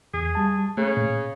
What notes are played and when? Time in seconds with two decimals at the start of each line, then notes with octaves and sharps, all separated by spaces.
0.14 E2 G#4
0.35 G3 A5
0.77 C#3 A3
0.97 A#2